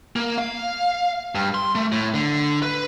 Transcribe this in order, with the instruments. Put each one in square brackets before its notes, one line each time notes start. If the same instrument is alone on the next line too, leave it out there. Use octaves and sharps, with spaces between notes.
[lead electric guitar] A#3
F5
G2
C6
A3
A2
D3
B4